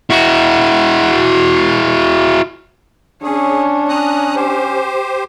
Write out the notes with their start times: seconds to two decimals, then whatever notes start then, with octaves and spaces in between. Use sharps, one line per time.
0.11 E4 F#4
3.23 C#4 D4 G#4 C#5
3.89 C#4 A#5 D#6 F#6
4.36 G4 C5